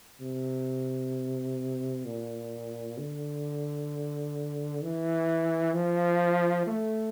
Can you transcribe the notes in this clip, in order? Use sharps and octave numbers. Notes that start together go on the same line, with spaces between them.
C3
A#2
D3
E3
F3
A3